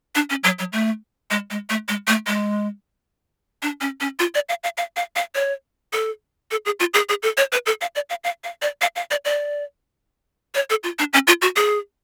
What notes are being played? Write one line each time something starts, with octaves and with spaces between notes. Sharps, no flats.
D4
C#4
F#3
F#3
A3
G#3
G#3
A3
G#3
A3
G#3
D4
C#4
C#4
F4
D5
F5
F5
F5
F5
F5
C#5
A4
A4
G#4
F4
G#4
G#4
A4
C#5
B4
A4
F5
D5
F5
F5
F5
D5
F5
F5
D5
D5
C#5
A4
F4
D4
C#4
F4
F#4
G#4